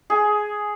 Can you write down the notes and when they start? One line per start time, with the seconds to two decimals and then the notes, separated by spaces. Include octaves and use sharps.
0.10 G#4